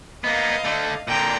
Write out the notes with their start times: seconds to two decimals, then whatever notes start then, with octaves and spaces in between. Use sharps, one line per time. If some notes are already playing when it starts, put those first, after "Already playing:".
0.24 A#3 B3 D#5 F5
0.64 D3 A3
1.08 A#2 D3 G5 A#5